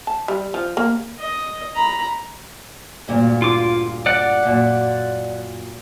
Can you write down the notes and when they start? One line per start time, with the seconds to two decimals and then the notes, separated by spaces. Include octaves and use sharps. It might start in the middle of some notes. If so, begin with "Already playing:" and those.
0.07 A5
0.28 G3
0.54 F3
0.77 A#3
1.19 D#5
1.75 A#5 B5
3.08 D2 G2 A#2
3.42 F4 D6
4.06 D5 F#5
4.45 F#2 A#2